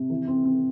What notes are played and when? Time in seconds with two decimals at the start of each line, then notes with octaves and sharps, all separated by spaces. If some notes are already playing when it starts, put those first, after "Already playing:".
Already playing: C3
0.10 E3
0.27 C4
0.45 C4